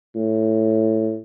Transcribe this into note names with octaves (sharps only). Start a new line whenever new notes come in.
A2